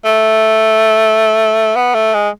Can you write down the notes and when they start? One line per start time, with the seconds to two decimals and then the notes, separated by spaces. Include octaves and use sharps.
0.05 A3
1.76 B3
1.95 A3
2.14 G#3